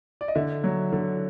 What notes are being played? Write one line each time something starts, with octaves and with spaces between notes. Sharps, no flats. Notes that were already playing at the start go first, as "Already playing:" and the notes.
D5
D#5
D3 E5
F#3
D3